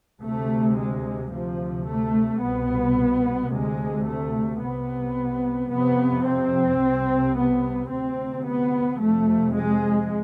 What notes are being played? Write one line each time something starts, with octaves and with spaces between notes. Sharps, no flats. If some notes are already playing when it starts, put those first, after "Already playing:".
D2 C3 A3
G#3
D2 C3 F3
A3
C2 B2 B3
D2 C3 G#3
A3
C2 C3 B3
F2 C3 B3
C4
C2 C3
B3
D2 C3 C4
B3
F2 C3 A3
G#3